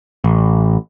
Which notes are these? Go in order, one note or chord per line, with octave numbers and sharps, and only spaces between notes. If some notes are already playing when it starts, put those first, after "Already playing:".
A1